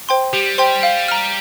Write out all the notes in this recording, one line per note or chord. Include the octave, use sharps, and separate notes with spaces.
C5 G5 C6
G3 G4
C5 G5 C6
F5
A#5 F6